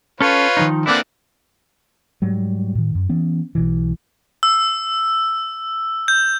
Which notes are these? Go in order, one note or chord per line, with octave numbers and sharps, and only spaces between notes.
C#4 F4 A4 B4 C#5
D#3 F3 D#4
D3 E3 A#3 C4 E4 D5
G#2 F#3 G3
A2 D#3
F#2
E3 B3 C#4
B1 B2 E3
E6
G6